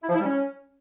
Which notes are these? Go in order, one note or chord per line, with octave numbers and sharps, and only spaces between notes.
E4
F3
E4
G3
C#4